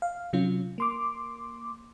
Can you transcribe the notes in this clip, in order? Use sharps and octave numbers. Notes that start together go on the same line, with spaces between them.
F5
C3 F#3 C#4 F4
A#3 C6 D6